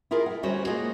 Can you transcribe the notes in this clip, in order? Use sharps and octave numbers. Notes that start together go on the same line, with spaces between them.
E4 F4 G#4 A#4
E5 F#5
D2 G3 C#4 F#4 C5 C#5
G#3 A#3 F4 G#4 D#5 F#5